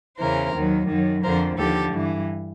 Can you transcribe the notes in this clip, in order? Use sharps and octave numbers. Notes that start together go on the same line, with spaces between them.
E2 C#3 E3 A#4 C5
D#2 D#3 F#3
F#2 D#3 F#3
F2 D3 F3 A#4 C5
D#2 D3 F3 G4 A4
G2 E3